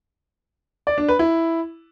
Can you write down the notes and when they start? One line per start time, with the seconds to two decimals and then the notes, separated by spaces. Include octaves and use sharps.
0.87 D5
0.98 D4
1.09 B4
1.19 E4